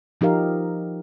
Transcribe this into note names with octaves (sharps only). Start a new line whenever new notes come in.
F3 D#4 G4 A#4 F5